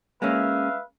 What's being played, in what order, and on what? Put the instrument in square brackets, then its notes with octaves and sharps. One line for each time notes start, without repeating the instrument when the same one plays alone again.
[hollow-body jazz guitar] G#3 A#3 C#4 [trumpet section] B4 E5 F5